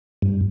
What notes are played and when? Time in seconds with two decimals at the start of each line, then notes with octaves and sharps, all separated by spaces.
0.22 G2